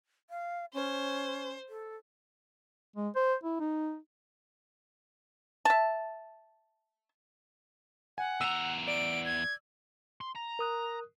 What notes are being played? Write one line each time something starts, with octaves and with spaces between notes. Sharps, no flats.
F5
C#4 C5
A4
G#3
C5
E4
D#4
E5 A5
F#5 G#5
E2 A#5 E6 D#7 E7
D5 D7
G#6
C6
A#5
A#4 D#6 F#6